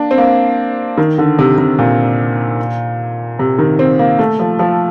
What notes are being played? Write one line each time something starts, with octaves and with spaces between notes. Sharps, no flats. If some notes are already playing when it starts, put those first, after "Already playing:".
Already playing: A#3 D4
C4
A#3
D#3
D3
C3
C3
A#2
C3
D#3
C4
A#3
A3
F3
F3